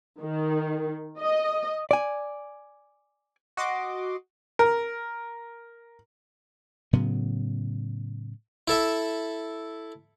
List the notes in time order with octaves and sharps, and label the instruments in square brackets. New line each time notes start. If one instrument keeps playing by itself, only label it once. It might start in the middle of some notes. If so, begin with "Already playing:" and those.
[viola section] D#3
D#5
[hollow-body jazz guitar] D5 G#5
[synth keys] F#4 D#5 C6 D6
[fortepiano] A#4
[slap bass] A2 C#3 F#3 B3
[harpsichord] E4 A4 E5